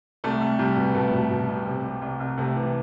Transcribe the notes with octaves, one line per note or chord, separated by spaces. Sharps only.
C2 A3
C2
C2 G3
B2
B2 A3
B2
B2
C2
C3
C2
C2
C2
C3 A3
E3